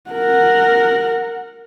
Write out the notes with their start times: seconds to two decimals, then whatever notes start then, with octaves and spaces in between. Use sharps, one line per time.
0.10 A#4 F#5